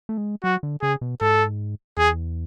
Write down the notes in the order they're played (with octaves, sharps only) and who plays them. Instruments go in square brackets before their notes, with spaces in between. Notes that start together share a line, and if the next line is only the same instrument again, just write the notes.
[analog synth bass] A3
G#3
[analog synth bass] F#3 [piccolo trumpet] F#4
[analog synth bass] D3
[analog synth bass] C#3 [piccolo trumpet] G#4
[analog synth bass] B2
[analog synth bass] G#2 [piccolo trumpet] A4
[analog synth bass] E2 [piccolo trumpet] G#4